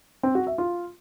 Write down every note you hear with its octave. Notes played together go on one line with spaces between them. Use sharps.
C4
F#4
E5
F4